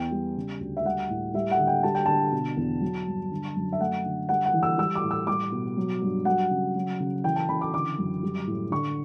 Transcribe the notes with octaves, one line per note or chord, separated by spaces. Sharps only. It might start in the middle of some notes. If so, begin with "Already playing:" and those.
Already playing: E2 B3 G5
G3
C#3
D2
E5
G3 F#5
A2
G3 E5
F#5
D3
G5
G3 A5
G5
D3 A5
B2
E2
F#3
G2
D3
F#2
E5
A3 F#5
D3
G3 F#5
F#5
E3
E6
G3 E6
D6
A2
E6
G3 D6
B2
F#3
G2
F#3 F#5
C#3
F#3
C#3
E3 G5
A5
C#3 B5
D6
D3 D6
F#2
G3
A2
D3 C#6